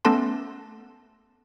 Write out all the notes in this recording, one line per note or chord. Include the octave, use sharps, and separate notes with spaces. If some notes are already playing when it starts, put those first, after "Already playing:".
A3 B3 C#4 A4 A5 C6